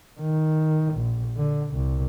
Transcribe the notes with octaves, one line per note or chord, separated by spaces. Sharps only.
D#3
A#1
D3
C2